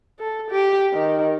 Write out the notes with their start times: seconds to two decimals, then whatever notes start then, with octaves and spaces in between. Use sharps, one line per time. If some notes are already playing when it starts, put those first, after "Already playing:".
0.20 A4
0.51 G4
0.94 D#3